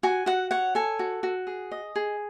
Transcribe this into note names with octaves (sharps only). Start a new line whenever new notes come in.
F#4 G#5
F#4 F#5
C#5 F#5
A4 G#5
F#4
F#4
G#4
D#5
G#4